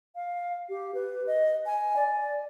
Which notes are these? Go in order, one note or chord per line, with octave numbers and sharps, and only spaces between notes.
F5
G4
B4
D#5
G#5
D5